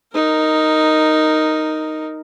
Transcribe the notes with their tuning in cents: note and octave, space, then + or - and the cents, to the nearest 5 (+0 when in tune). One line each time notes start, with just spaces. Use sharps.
D#4 +0 A#4 -10